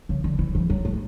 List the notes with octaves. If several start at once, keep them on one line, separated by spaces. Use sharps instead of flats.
C#3
D3
E3
E3
F#3
A2